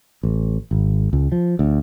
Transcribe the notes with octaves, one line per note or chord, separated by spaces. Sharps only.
A1
G#1
C#2
F3
D2